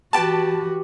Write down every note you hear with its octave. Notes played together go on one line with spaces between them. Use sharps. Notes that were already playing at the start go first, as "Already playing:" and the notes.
E3 F#4 G4 B4 A5